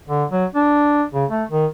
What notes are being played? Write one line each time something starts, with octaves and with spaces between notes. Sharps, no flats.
D3
F#3
D4
C#3
A3
D#3